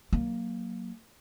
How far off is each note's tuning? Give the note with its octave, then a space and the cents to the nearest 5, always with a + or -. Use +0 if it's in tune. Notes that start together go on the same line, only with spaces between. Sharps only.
F#3 +0 A#3 +0